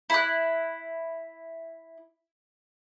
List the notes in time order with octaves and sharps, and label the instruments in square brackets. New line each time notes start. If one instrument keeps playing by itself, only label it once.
[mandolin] E4 F#6